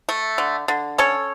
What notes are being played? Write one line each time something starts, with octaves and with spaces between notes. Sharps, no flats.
A3
D3
D3
C#4 A4 C#5